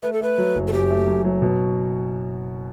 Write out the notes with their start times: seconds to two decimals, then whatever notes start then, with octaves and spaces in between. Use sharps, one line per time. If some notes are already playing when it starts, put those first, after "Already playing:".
0.03 A3 B4
0.13 A4
0.21 A3 B4
0.38 F#3
0.55 F#1
0.67 A4
0.73 F#2 G4
0.90 A3
1.07 F#2
1.24 F#3
1.42 B2